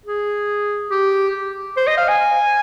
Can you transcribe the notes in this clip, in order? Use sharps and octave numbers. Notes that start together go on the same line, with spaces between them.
G#4
G4
C5
D#5
F5
G#5